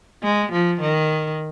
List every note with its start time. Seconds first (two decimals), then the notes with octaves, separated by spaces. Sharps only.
0.23 G#3
0.52 F3
0.80 D#3